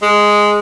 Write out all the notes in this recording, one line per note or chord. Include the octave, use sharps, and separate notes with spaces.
G#3